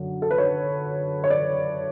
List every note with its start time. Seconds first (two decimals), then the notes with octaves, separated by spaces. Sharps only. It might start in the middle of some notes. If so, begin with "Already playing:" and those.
Already playing: F#2 D3
0.22 A4
0.31 B4
0.38 C#5
1.24 C#5
1.30 D5